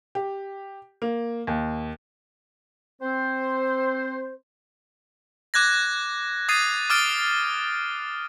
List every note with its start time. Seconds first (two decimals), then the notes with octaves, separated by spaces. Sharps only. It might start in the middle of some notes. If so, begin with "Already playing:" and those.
0.15 G4
1.02 A#3
1.47 D#2
3.01 C4 C5
5.54 D6 F#6 G#6 A#6
6.49 D#6 G#6 A6 C7 D#7
6.90 D6 D#6 F6 A6 D7 G7